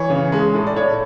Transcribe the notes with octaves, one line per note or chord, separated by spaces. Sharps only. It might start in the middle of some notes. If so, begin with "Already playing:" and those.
Already playing: E3 C#5
C#3
G#3
A2
D5
A2 C#5